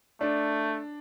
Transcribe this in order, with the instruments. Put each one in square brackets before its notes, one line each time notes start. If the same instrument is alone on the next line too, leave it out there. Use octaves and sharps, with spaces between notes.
[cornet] A3 [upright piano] D4